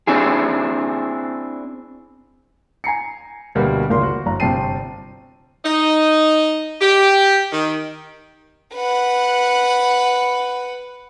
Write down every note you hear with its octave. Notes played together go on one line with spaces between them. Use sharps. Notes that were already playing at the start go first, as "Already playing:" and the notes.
C4 D4 E4 G#4
G#5 A#5 C7 C#7
D2 B2 G3 A#3
G#1 C#2 A#3 C6
F#4
G1 A#5
G1 C3 G5 A5 C7 D#7
D#4
G4
D#3
B4 F#5